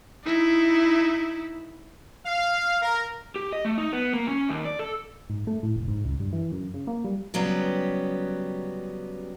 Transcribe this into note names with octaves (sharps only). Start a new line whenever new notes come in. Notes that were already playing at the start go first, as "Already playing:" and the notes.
D#4 E4
F5
A#4
G4
D#5
A3
D#4
B3
A#3
C#4
D#2
D5
A4
G#2
A3
A2
F1
G#2
C#2
G2
E3
F#2
C#3
A#3
G3
C#3 F#3 G3 B3 G4